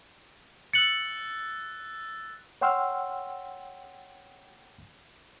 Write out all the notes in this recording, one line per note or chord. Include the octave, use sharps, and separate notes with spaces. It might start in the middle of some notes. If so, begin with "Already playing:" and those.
E6 F#6 A6 C#7 F#7
C#5 F#5 G5 C6 E6 F6